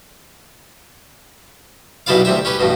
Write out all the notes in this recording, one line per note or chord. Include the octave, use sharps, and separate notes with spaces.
B1 B2 G3 E4 D5 F5
D2 C3 G3 E5
C#4 G4 B4
A1 G2 B2